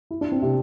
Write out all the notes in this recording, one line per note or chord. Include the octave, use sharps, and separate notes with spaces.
E4
D4
C4
C3